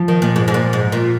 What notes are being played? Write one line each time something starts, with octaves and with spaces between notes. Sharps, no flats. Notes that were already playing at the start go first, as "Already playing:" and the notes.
Already playing: F3
D#3
A#2
G#2
G#2
A#2
G#2
A#2